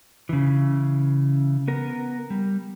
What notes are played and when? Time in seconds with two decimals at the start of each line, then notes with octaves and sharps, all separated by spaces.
0.29 C#3 E3
1.68 B3 A#4
2.30 G3